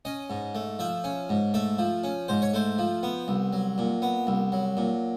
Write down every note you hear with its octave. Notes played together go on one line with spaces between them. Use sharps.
C#4 D#5
G#2
A3
F3 E5
C#4
G#2
A3 E5
F3
C#4
G#2 C5
C#5
A3 C5
F3
B3
C2
F#3
A#2
B3
C2
F#3
A#2